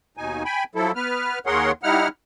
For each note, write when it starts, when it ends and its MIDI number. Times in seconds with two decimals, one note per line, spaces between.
0.17 0.43 39
0.17 0.43 47
0.17 0.43 63
0.17 0.43 80
0.45 0.64 79
0.45 0.64 80
0.45 0.64 83
0.75 0.92 53
0.75 0.92 54
0.75 0.92 64
0.75 0.92 69
0.96 1.39 59
0.96 1.39 71
0.96 1.39 89
1.46 1.72 39
1.46 1.72 68
1.46 1.72 70
1.46 1.72 73
1.46 1.72 78
1.46 1.72 84
1.83 2.08 55
1.83 2.08 63
1.83 2.08 64
1.83 2.08 78
1.83 2.08 89